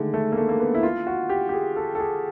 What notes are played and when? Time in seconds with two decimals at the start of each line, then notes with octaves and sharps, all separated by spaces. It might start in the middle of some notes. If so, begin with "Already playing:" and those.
Already playing: D3 D#3 G#3 A3
0.14 A3
0.32 A#3
0.38 A3
0.49 A#3
0.60 B3
0.75 E4
0.83 F4
1.07 F#4
1.29 G4
1.49 G4
1.53 G#4
1.76 A4
1.95 A4
2.00 G#4